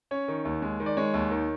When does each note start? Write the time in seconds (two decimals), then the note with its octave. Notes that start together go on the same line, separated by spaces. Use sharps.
0.11 C#4 C#5
0.28 D#3
0.45 D#2
0.62 G#3
0.80 D#3
0.86 D5
0.97 G#3 C#5
1.14 D#2
1.31 D#3